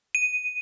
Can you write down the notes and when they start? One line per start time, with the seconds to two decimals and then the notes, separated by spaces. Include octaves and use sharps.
0.15 D#7